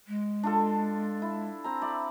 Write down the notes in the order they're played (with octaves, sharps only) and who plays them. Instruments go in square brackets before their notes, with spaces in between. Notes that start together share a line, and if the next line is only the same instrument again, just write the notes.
[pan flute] G#3
[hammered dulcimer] D4 F4 A4
E4
C4 A#5
E4 D5